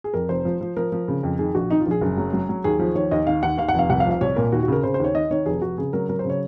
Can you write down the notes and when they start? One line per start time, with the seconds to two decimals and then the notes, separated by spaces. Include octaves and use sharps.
0.04 G#4
0.14 F2 A#4
0.29 F1 C5
0.45 F3
0.61 F3
0.77 F3 A#4
0.92 F3
1.08 C#3
1.23 F2
1.39 D#3 G#4
1.55 A#1 F#4
1.71 D#3 D#4
1.80 F4
1.86 A#1 G#4
2.01 F#1
2.17 F#3
2.33 F#3
2.49 F#3
2.64 D#2 G#4
2.79 F3
2.95 D#2 C#5
3.11 D#2 D#5
3.27 D#3 F5
3.43 D#2 F#5
3.58 D#2 F5
3.69 F#5
3.74 F1 F5
3.90 C2 F#5
4.00 F5
4.05 F3
4.11 F5
4.21 C2 C#5
4.36 A#2 A#4
4.52 D#2 F#4
4.63 F#4
4.68 C#3 A#4
4.83 C#3 C5
4.94 C5
5.00 D#2 C#5
5.14 D#3 D#5
5.31 D#3 C#5
5.46 F1 G#4
5.61 F1 F#4
5.78 C#3 G#4
5.93 F#3 A#4
6.09 F#3 A#4
6.19 C5
6.25 C#3
6.30 C#5